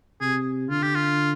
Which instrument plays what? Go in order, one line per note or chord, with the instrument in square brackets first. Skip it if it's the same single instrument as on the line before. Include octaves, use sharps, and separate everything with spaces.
[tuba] C3 [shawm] G#4
[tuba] D3 [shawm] F4
[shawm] G4
F4